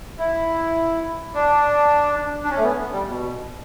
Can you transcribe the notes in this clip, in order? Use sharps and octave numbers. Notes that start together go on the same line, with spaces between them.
E4
D4
D4
C#4
A3
B3
G3
B2